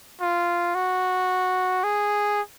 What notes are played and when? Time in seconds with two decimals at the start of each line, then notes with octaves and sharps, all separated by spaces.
0.21 F4
0.75 F#4
1.84 G#4